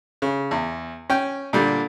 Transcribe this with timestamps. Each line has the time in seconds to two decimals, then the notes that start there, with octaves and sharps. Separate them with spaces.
0.22 C#3
0.51 E2
1.10 C#4 G5
1.53 A#2 D3 G3